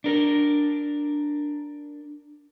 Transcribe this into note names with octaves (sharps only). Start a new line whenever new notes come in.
D4 A#4